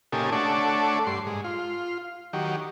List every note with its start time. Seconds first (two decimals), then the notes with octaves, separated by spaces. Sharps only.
0.12 A#2 C#3 D#4 G4 A4 G#5
0.32 A3 D4 A4 C#5 D5 F#5
1.07 G2 C6
1.26 G#2
1.44 F4
2.33 D#3 F#3 G4